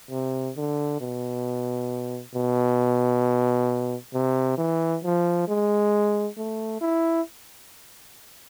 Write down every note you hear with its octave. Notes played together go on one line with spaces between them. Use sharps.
C3
D3
B2
B2
C3
E3
F3
G#3
A3
E4